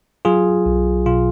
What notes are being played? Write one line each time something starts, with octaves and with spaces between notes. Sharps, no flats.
F#3 F4 G#4
B1
B2 F4